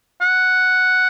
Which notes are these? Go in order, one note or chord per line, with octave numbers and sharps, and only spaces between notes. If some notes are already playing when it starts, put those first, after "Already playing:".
F#5